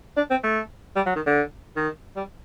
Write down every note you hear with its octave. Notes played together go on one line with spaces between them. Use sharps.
D4
C4
A3
G3
F#3
D#3
D3
D#3
G3